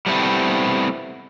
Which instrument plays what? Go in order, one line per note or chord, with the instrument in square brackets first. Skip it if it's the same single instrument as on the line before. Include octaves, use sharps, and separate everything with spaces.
[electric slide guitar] G3 A3 B3 C4 E4